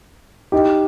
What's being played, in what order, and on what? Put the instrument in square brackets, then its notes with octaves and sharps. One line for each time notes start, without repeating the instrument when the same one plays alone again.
[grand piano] D#4 G4